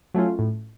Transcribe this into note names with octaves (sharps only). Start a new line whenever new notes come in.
F#3 A3 C#4 F4
A2